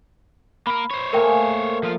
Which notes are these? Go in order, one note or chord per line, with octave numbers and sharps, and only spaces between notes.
A#3 A#4 B5
C5 C#5
A3 A#3 G#4 A#4 G5
F3 F4